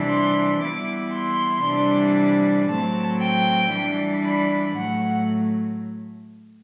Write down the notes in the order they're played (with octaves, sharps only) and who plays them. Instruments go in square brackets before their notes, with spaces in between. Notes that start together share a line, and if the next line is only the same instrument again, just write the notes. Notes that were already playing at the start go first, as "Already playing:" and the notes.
Already playing: [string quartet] C3 E3 G3 D4
C6
E3 G3 B3 E4 D6
C6
C3 E3 G3 D4
A2 F#3 A3 C4 A5
G5
E3 G3 D4
B5
A2 F#3 A3 F#5